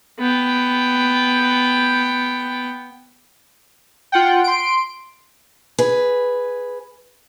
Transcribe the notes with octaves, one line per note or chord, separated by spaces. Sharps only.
B3 G5
F4 F#5 G5
C6 D7
G#4 B4